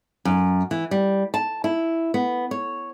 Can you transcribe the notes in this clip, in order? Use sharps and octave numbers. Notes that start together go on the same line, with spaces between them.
F#2
E3
G3
A5
E4
B3
C#5